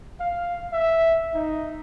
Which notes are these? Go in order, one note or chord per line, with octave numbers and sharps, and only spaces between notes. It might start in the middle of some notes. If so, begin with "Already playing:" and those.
F5
E5
D#4